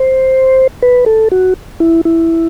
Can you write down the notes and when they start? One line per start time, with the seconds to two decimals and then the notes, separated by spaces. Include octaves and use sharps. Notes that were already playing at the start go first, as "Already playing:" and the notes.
Already playing: C5
0.82 B4
1.06 A4
1.32 F#4
1.80 E4
2.05 E4